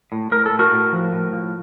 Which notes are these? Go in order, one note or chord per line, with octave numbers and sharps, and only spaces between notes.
A2
A2 A#4
A4
A2
F#4 A#4
A2
F3
A2
F3